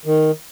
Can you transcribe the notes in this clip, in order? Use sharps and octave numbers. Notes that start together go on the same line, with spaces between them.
D#3